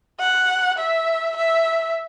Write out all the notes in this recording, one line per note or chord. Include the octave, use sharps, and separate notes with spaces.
F#5
E5
E5